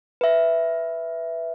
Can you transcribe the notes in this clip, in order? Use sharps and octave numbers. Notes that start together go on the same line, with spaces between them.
B4 E5